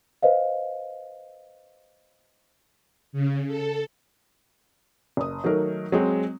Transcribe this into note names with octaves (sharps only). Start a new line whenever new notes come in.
B4 C5 D#5 F5
C#3
A4
F#1 D#6
D#3 F#3 A3 A#4
F#3 G#3 C4